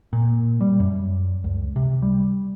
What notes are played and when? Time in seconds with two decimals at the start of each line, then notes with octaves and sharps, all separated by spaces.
0.13 A#2
0.61 G3
0.80 F#2
1.44 C#2
1.76 C3
2.02 G3